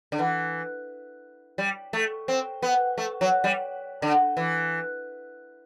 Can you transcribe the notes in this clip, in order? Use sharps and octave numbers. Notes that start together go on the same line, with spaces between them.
D3
E3
G3
A3
C4
B3
A3
F#3
G3
D3
E3